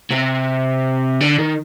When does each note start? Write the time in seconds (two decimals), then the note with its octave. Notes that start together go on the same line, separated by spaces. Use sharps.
0.10 C3
1.21 D3
1.39 D#3